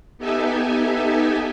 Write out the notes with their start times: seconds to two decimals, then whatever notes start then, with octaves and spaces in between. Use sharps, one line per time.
0.18 B3 D#4 G4 A4 E5 G#5